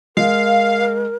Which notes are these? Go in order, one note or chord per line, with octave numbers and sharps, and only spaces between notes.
G#3 A#4 F5